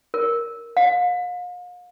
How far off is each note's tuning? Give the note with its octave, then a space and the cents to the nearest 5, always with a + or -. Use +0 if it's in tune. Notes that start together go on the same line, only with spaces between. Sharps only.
A#4 +5
F5 +40